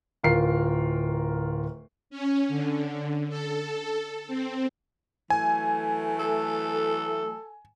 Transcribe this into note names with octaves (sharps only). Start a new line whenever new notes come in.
D1 F4 A#4 C7
C#4
D3
A4
C4
E3 F#3 A3 G#5
A4